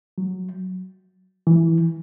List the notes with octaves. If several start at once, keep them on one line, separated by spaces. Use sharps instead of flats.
F#3
E3